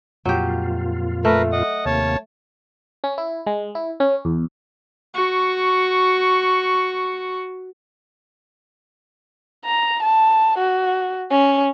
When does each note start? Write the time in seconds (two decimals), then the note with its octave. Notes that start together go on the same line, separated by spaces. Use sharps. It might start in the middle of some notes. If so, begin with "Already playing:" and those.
0.25 F2 A#2 F#3 F4 G4
1.25 A3 A#4 B4
1.52 D#5 F#5
1.86 D#2 C3 A#3 C#5 A5
3.04 C#4
3.18 E4
3.46 G#3
3.75 E4
4.00 C#4
4.25 E2
5.14 F#4 C#6
9.65 A#5
10.03 A5
10.59 F#4
11.31 C#4